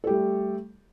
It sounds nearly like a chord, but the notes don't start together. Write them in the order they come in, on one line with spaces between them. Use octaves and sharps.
A4 G4 G3 A3